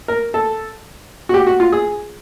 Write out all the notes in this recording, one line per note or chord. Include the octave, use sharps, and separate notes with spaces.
A#4
A4
F#4
G4
F#4
F4
G#4